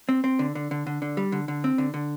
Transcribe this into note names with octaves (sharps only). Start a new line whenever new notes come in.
C4
C4
D3
D3
D3
D3
D3
G3
D3
D3
C4
D3
D3